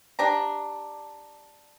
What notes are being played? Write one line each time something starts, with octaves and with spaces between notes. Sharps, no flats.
D4 G4 A#5